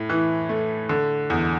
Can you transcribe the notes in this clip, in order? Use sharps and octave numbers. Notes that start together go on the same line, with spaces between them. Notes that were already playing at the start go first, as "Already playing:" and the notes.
Already playing: A2
E3
A3
D3
E2